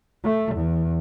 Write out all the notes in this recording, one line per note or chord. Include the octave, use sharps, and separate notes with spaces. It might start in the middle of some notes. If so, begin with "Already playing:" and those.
A3
E2